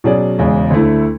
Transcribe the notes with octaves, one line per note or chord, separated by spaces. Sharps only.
B2 F#3 C#4 G#4 D5
E1 E2 C#3 G#3
D2 D3 A3 E4